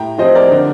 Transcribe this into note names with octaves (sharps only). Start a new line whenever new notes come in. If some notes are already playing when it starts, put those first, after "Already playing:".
Already playing: A2 G5 A#5
F3 C4 C5 D#5
A#4 D5
D3